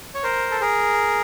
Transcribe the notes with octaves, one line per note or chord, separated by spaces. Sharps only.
C#5
A#4 C5
A4
G#4 A#4